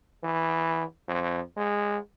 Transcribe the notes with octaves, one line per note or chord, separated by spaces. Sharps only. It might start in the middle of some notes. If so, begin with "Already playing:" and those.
E3
F2
G#3